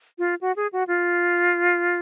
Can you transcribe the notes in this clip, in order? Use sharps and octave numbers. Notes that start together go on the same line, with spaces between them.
F4
F#4
G#4
F#4
F4